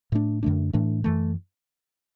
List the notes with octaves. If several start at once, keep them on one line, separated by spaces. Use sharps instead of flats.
A2 A3 D4
F#2 D3 A3 D4
A2 E3 A3 D4
F#2 E3 A3